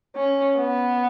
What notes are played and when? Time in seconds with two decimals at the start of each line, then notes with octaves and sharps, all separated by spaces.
0.16 C#4
0.57 B3